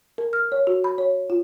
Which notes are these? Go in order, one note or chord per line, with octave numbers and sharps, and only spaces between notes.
A#4
F6
C#5
F#4
B5
C#5
F4